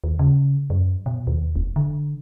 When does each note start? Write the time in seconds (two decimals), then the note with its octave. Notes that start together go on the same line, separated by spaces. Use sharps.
0.04 D#2
0.19 C#3
0.70 F#2
1.06 B2
1.27 D#2
1.56 F1
1.76 D3